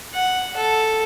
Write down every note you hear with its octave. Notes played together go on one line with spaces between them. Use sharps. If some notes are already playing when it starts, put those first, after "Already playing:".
F#5
A4